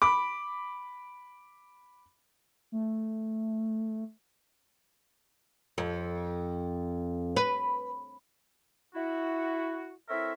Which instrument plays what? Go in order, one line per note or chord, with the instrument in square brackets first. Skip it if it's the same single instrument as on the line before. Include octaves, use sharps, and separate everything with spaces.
[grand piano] B5 D6
[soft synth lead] A3
[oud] F2
B4
[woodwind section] E4 F#4
C4 E4 A4 A#4 C#5 E5